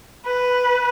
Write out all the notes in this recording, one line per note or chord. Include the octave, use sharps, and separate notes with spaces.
B4